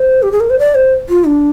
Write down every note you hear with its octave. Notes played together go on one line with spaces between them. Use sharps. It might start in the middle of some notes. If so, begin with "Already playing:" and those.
Already playing: C5
G4
G#4
A#4
C5
D5
C5
F4
D4